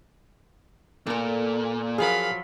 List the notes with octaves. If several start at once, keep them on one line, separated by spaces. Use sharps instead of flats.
A#2 A4 A#4
F#2 F3 F#3 G#4 A#4 F5 B5